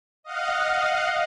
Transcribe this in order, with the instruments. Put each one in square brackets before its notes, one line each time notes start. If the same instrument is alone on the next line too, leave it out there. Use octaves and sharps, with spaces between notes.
[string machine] D#5 F5 F#5